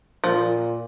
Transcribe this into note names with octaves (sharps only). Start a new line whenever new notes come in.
A#2 F3